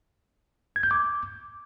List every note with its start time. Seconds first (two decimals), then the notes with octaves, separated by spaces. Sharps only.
0.76 G#6
0.83 G6
0.91 D6